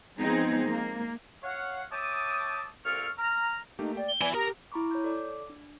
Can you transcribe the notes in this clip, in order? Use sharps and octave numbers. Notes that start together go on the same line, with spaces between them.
F3 G#3 B3 C4 D#4 G#4
A#3
C#5 F5 F#5
C#5 E5 G5 A5 D6 D#6
C2 A#3 C4 A4 C#6 F6
A#5 F6
A3 A#3 D#4 G4
D5 G5
G7
B3 E4 D5 G#5
G4 A#4 A#5 D#6
E4 A#5 B5 C#6 D6
C#5 G6
A4 D5 D6
D4